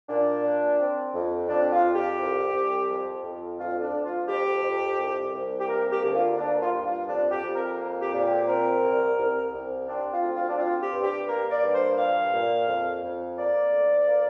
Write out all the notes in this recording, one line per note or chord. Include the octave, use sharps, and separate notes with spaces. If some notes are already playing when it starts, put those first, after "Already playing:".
A#2 D4
A#2
C4
F2
F2 D4
F4
F2
G4
C2
C2
F2
F2
D2 F4
D4
D2
F4
F2 G4
F2
C2
C2
G4
A#3 A#4
G4
D2
F4
A#3 D4
F4
G2
F4
F2 D4
G4
F2
A#4
A#3
G4
A#2
G4
C4 A#4
C2
C2
C2
C4 D4
F4
D2
F4
D4
C4 F4
G4
G2
G4
A#3 A#4
D5
G2
C5
A#2 F5
A#2
F2
F2
A#3 D5
D2
A#3